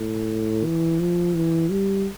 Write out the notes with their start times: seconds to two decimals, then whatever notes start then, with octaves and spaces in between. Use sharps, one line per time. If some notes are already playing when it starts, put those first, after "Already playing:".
Already playing: A2
0.65 E3
1.00 F3
1.36 E3
1.71 G3